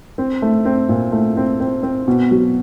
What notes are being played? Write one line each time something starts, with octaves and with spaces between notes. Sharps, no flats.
C4
A3
C4
A#2
A3
C4
C4
C4
B2
F#3